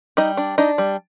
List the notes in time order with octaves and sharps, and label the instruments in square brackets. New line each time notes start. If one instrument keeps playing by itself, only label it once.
[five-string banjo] G3 D#4 D#5
D4
D4 D#4 D#5
G3